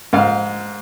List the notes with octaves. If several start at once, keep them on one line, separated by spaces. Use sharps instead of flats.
G#2 F5